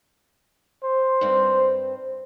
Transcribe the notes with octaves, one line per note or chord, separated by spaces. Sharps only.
C5
G2 C4